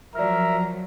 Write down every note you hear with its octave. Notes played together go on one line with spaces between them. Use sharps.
F3 F#3 A#4 D5 E5 A#5 F6